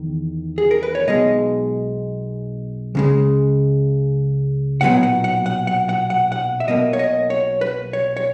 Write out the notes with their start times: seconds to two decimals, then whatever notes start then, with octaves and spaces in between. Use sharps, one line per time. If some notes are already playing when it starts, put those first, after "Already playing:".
Already playing: E2 D#3
0.58 G#4
0.71 A#4
0.83 B4
0.95 C#5
1.08 B1 B2 G#3 D#5
2.95 C#2 C#3 G#3
4.81 B1 A#2 F#3 B3 F#5
5.03 F#5
5.24 F#5
5.46 F#5
5.67 F#5
5.89 F#5
6.10 F#5
6.32 F#5
6.60 E5
6.68 B1 B2 A#3 D#5
6.93 C#5
6.99 D#5
7.30 C#5
7.61 B4
7.93 C#5
8.17 C#5